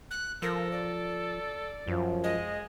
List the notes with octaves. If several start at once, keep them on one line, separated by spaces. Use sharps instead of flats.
F#6
F3 A4 A#4
D5
F#2 F3
G#3 D#5